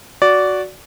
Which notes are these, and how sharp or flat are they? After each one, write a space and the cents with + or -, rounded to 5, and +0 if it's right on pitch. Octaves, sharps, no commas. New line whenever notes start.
F#4 +0 D5 -15